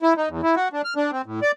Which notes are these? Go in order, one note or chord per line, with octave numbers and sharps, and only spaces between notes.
E4
D#4
E2
E4
F#4
D4
F6
D4
C4
A2
D5